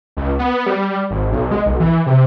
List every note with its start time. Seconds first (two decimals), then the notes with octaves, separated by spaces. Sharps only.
0.17 C#2
0.39 B3
0.66 G3
1.11 G#1
1.32 B1
1.51 G#3
1.66 B1
1.80 E3
2.06 C3